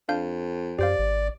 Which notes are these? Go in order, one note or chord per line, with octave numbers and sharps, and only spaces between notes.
F2 D4 F5 G6
F#2 G4 C5 D5 F5
G#1